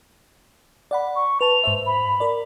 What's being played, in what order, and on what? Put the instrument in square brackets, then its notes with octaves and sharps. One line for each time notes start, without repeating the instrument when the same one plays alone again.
[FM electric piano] D5 F#5 B5
[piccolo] C#6
[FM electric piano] B4 A5 [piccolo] F7
[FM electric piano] G#2 C5 E5
[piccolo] B5
[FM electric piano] A#4 D5